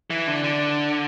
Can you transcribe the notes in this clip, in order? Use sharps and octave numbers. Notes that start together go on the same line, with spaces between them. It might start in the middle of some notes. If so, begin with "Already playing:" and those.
E3
D3
D3